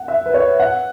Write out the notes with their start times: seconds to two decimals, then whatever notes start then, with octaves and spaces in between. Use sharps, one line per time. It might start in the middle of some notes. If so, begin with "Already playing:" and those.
Already playing: F#5
0.08 E5
0.26 B4
0.34 C#5
0.60 F#5